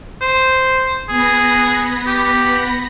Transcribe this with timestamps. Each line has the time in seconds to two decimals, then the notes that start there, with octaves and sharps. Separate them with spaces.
0.21 C5
1.09 B3 G#4 B5 A#6
2.07 G4